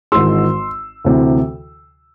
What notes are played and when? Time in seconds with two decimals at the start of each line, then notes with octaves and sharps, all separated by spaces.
0.12 G#1 G#2 E3 G#3 C6 E6
1.05 D2 C3 E3